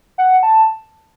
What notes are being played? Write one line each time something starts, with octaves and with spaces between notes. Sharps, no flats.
F#5
A5